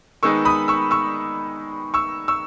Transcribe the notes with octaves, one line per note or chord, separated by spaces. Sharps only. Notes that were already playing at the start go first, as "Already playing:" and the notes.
D#3 G#3 B3 D#4 C#6 E6
B5 D#6
C#6 E6
C#6 E6
C#6 E6
C#6 E6